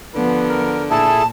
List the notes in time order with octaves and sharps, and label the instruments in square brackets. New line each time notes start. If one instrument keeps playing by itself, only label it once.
[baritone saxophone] D3 [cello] F3 B3
[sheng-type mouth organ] A#4
[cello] A#2 [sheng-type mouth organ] E4 G#4 A4 [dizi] A5